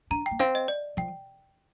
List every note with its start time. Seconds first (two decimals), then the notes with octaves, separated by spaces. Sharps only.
0.11 D4 A#5
0.26 G5
0.31 A#3
0.39 C4 F5
0.55 D#5
0.68 D5
0.97 F3 G5